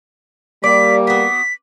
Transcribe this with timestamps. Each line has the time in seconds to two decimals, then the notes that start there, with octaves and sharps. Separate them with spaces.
0.64 G3 A#3 D5 D6 B6
1.07 B3 F#4 B6